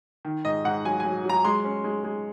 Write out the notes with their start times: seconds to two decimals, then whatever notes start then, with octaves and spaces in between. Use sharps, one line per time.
0.25 D#3
0.45 G#2 D#5
0.64 G#2 F#5
0.85 F#3 G#5
1.00 G#5
1.05 F#3
1.24 F#3
1.29 A#5
1.44 G#3 C6
1.65 C#4
1.84 G#3
2.04 G#3